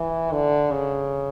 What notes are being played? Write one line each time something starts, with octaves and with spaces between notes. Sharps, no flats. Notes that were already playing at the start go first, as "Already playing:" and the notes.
Already playing: E3
D3
C#3